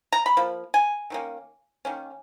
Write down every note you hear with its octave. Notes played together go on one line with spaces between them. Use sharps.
A#5
B5
F3 A#3
G#5
D#3 F#3 A#3 C#4
D#3 A#3 C#4